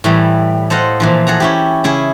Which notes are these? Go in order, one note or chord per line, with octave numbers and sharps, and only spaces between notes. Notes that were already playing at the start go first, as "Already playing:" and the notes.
A2 E3 G3
A4 C5 D#5 F5 F#5
A#2 E3 F3
G#4 A4 F#5 A#5
C#4 E4 G4
C#3 E4 G#4